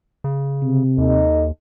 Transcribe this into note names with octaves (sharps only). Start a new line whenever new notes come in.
C#3
C3
D#2 D#4 A4 D#5